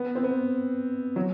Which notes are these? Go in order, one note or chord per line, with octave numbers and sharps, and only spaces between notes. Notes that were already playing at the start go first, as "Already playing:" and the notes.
Already playing: B3
C4
B3
F#3